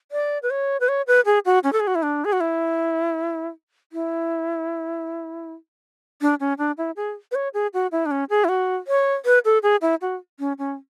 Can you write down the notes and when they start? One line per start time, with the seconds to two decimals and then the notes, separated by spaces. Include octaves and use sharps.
0.12 D5
0.43 B4
0.50 C#5
0.80 B4
0.88 C#5
1.07 B4
1.26 G#4
1.46 F#4
1.64 C#4
1.73 A4
1.80 G#4
1.87 F#4
1.95 E4
2.03 D4
2.25 G#4
2.33 F#4
2.40 E4
3.93 E4
6.21 D4
6.40 C#4
6.58 D4
6.78 E4
6.96 G#4
7.32 B4
7.35 C#5
7.54 G#4
7.74 F#4
7.92 E4
8.06 D4
8.11 C#4
8.30 G#4
8.44 E4
8.49 F#4
8.87 C#5
9.25 B4
9.45 A4
9.63 G#4
9.82 E4
10.01 F#4
10.39 C#4
10.58 C#4